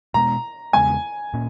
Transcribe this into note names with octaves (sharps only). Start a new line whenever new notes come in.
B2 G#3 B3 A#5
E2 C#3 G#3 B3 G#5
A#2 A#3 C#4